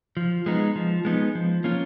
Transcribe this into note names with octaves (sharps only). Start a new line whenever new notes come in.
F3
G#3 B3 D#4
F3
G#3 B3 D#4
F3
A#3 C#4 F4